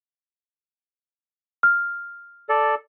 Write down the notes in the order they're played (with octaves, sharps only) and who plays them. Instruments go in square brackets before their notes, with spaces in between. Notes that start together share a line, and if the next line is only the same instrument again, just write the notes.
[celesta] F6
[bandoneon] A4 D5